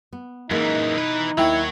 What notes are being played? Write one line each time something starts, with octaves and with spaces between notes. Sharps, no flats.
B3
F#2 E3 G#3 A#3 D#4
B2 E3 B4
D#2 F#3 E4 C#5 G5